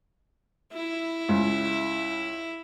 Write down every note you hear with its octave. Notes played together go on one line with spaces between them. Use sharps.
E4
C#2